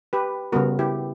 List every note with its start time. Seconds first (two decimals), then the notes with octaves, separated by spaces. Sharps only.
0.13 G4 B4
0.52 C#3 G3 B3 F#4 A#4
0.79 E4 G4